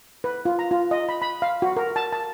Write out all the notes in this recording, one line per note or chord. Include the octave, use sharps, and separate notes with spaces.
B4
F4
A#5
F4
D#5
B5
B5
F5
F#4
A#4
A5
A5